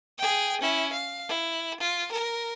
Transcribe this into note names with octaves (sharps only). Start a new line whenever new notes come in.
G#4 G5
C#4 E4
F5
E4
F4
A#4